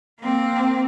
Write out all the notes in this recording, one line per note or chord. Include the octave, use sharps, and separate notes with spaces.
A#3 C4